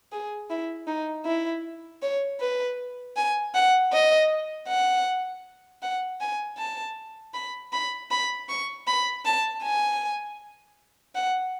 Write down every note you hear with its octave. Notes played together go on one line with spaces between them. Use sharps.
G#4
E4
D#4
E4
C#5
B4
G#5
F#5
D#5
F#5
F#5
G#5
A5
B5
B5
B5
C#6
B5
A5
G#5
F#5